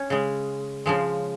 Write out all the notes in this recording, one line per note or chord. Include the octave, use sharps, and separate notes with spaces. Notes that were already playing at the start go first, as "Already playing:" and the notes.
Already playing: C#4
C#3 G#3
C#3 F3 G#3